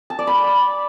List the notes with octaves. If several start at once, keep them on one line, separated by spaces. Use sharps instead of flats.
A5
D5
B5